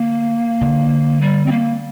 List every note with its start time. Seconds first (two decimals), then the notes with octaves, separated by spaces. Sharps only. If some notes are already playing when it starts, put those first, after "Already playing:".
Already playing: D3 A#3
0.61 D3
1.21 G3
1.46 C4
1.52 A#3